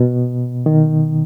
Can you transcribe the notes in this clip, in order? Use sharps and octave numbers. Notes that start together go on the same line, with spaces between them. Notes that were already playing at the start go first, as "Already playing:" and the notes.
Already playing: B2
D#3